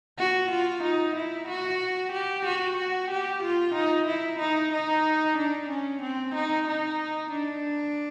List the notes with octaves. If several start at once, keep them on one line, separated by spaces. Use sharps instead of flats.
F#4
F4
D#4
E4
F#4
G4
F#4
F#4
G4
F4
D#4
E4
D#4
D#4
D4
C#4
C4
D#4
D#4
D4